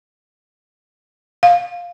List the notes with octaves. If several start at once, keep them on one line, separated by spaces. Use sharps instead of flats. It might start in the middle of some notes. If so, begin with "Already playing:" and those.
F5